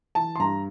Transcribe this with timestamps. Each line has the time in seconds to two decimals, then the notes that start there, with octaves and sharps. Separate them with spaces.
0.15 E3 A5
0.36 C6
0.39 G2 A#5